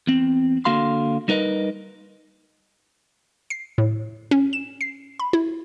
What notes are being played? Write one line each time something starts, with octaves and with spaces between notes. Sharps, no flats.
E2 C4
D3 A#3 F#4 F5 C6
G3 D#4 A#4 B4 D#5
C7
A2
C#4
E7
C7
B5
E4